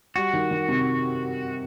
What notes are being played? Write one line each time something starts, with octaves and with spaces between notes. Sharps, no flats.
G3 F#4
D#3
D#3
C3